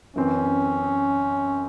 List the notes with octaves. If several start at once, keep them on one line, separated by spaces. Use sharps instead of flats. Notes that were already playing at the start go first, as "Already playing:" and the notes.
F#2 E3 C4 C#4